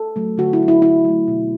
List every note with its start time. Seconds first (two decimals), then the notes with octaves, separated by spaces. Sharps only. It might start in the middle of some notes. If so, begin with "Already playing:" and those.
Already playing: A4
0.16 F#3 A3
0.38 D3 F#4
0.53 E4
0.61 F#3 A3
0.68 E4
0.82 D3 E4
1.05 F#3 A3
1.28 B2